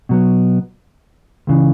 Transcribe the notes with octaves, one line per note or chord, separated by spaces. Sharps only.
B2 F#3 B3
C#2 C#3 E3